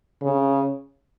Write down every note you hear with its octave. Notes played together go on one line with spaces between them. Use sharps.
C#3